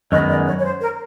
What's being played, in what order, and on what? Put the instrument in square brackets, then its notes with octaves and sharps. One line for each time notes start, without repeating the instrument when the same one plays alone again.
[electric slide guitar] F#2 D#3 G#3 B3 [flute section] D#5
[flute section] D5
C#5
C#5
C5
A#4